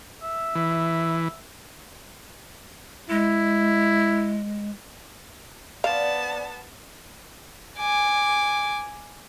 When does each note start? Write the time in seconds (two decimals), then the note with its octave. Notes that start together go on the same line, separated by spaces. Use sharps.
0.23 E5
0.55 E3
3.10 G#3 E4
5.84 B3 A#4 C5 D5 F5 A5
7.78 G#5 D6